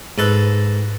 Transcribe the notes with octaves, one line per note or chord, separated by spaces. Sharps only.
G#2 A4 B4